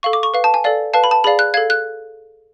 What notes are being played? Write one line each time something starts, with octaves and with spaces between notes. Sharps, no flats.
A4 F5 C#6
D6
C#6
B4 F5
A5
G#5
A4 D5 F5
B4 F5 A5
B5
A5
G#4 D5 F5 B5
F#6
A4 F5 G#6
F#6